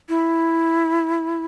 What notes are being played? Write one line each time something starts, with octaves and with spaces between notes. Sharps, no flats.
E4